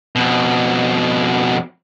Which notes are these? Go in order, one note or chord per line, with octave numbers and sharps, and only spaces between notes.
F2 B2